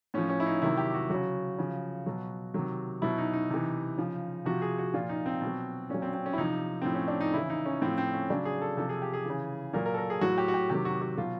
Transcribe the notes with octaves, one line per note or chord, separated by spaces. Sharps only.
A2 F3 C#4
C#4
E4
D#4
C3 D#3 F#3 E4
G4
F#4
C#3 F#3 F#4
C#3 F3
B2 F#3
C3 D#3 F#3
B2 F#3 E4
D#4
D#4
C3 E3
C#3 F3
C3 F3 F#4
G#4
F#4
A#2 F3 F4
D#4
C4
B2 F#3
A#2 F#3 C#4
C4
C4
C#4
E4
C3 F3 D#4
A2 F3 C4
C#4
D4
D#4
C#3 E3 E4
D#4
C#4
A2 F3 C4
C4
C#4
C#3 F#3 D4
G#4
A4
C3 F3 A4
G#4
G4
G#4
C#3 E3
A#2 F#3 A#4
A#4
A4
A#4
G#4
A2 F#3 F#4
G4
F#4
G4
C3 D#3 F#3 G4
F#4
F#4
B2 F#3 F4